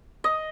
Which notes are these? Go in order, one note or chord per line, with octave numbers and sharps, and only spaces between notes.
D#5